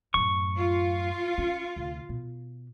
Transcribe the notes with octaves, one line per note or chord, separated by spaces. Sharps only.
F#2 A2 C#6
F4
C#4
D2 C3
B2